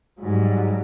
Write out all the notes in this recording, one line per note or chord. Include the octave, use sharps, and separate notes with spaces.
G#2 F#3 G3